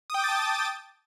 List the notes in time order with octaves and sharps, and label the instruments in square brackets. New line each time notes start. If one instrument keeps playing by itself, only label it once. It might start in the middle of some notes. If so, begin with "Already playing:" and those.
[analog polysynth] D#6
G5
D6
A6
A5